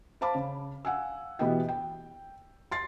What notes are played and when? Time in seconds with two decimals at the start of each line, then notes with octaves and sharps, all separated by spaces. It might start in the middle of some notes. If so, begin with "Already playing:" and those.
0.21 C5 F5 A5 B5 D6
0.35 C#3
0.85 F5 F#5 G#5 E6
1.39 B2 E3 B3 G4 D#5 G5
1.69 G5
2.72 C6 A6 C7